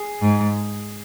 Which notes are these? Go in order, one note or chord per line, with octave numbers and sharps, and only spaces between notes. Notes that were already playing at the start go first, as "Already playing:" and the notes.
Already playing: G#4
G#2